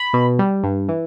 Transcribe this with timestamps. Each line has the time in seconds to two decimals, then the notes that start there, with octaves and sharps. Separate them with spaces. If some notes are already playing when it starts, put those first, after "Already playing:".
Already playing: B5
0.13 B2
0.39 G3
0.64 G2
0.89 E3